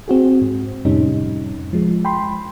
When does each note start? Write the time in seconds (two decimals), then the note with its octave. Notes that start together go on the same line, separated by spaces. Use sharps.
0.08 C4 F#4 G#4
0.42 G#2
0.85 F2 A2 C3 G3 C#4 D#4
1.73 F3 G#3
2.05 G5 B5 C6